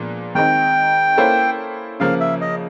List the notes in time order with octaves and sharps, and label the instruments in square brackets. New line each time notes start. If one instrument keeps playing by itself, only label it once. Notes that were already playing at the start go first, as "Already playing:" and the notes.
Already playing: [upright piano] A#2 F3 G#3 B3 D4
[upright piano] D#3 G#3 C4 D#4 [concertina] G5
[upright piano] A#3 C#4 E4 A4 C5
[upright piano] C#3 F3 A#3 [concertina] F5
[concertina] E5
D#5